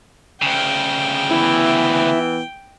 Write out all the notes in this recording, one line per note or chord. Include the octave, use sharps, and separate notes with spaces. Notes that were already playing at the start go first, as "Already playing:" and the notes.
D2 C#3 G5
E3 B3 E4